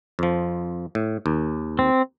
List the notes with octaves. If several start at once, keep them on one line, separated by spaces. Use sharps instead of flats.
F2 F3
A2
D#2
C4